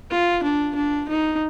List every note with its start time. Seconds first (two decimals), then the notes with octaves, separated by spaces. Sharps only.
0.11 F4
0.43 D4
0.76 D4
1.09 D#4